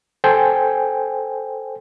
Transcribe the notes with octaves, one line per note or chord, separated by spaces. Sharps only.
A4 C5 G5 G#5